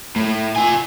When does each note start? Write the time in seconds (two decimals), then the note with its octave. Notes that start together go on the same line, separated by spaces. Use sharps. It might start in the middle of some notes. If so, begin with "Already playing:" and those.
0.16 A2
0.56 F4 G#5